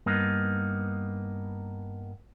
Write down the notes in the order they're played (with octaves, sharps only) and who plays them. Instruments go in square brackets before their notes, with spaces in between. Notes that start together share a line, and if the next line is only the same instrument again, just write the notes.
[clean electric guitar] G2 A#3 B3 D#4